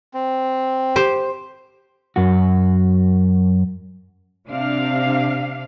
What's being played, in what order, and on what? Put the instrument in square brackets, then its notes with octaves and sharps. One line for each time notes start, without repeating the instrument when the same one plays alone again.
[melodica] C4
[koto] G4 C5
[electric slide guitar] F#2 F#4
[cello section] C3 D4 F5